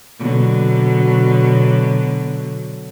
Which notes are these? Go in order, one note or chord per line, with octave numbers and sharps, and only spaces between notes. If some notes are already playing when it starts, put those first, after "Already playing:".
B2 D3 F#3